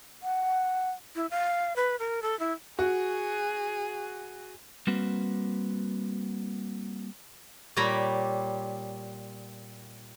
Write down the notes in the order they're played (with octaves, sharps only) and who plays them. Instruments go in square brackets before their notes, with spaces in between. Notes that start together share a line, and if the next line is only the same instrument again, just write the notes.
[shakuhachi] F#5
[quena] E4
F5
B4
A#4
A4
E4
[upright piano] F#4 [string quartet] G#4
[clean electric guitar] G3 A#3 C4 F#4 B4
[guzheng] A#2 G3 C#5 D5 A#5 B5